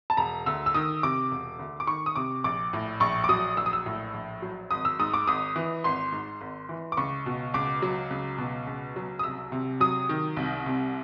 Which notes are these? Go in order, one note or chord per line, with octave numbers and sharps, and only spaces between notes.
A5
E1 A#5
D2 E6
E6
D#3 D#6
C3 D6
E1
D2
D6
D#3 C#6
D#6
C3 D6
A#1 D6
A2
A#1 C#6
D6
F#3 D#6
A#1 E6
D#6
E6
A2
A#1
F#3
G#1 D#6
E6
G#2 D#6
D6
G#1 D#6
E3
G#1 C6
G#2
G#1
E3
D6
C#2 C#6
B2
C#2 D6
F#3
C#2
B2
C#2
F#3
D#6
C2 E6
C3
F#3 D#6
D#3
C2
C3